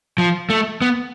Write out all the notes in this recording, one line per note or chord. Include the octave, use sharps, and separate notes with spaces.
F3
A3
B3